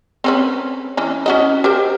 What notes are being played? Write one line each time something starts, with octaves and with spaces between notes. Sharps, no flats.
C4 C#4 B4
E3 C#4
C#4 F#4 D#5
G4 A#4 C5